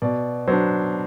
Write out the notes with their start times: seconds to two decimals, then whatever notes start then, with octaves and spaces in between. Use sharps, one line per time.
0.02 B2 D5
0.48 F#3 B3 D4 C5